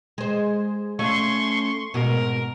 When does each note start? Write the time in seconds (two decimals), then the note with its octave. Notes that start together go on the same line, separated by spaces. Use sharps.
0.18 G#3 C5
0.99 A3 C#4 F5 C6 C#6
1.94 G#2 B2 A#4